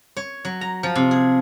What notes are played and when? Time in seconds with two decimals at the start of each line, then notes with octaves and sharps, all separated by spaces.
0.17 C#5
0.45 F#3
0.61 A#5
0.83 F3
0.95 C3
1.11 G#4